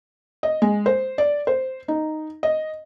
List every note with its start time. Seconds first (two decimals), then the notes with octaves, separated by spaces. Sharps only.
0.43 D#5
0.62 G#3
0.86 C5
1.18 D5
1.47 C5
1.88 D#4
2.43 D#5